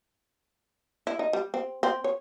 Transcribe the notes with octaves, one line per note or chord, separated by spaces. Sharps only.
E4
D#4
G3
C4
C4
C#5